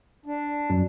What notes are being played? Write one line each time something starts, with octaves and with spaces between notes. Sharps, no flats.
D4
F#2